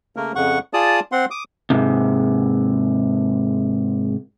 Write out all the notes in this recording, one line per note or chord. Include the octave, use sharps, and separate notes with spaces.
C#3 A3 A#3 A#4
F2 C#3 F#5 C#6
F4 G#4 D5 A5 D#6
C4 F#5 C6
D6 D#6
G#2 C3